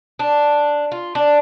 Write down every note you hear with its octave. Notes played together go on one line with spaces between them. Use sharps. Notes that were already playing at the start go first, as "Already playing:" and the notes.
D4
F4
D4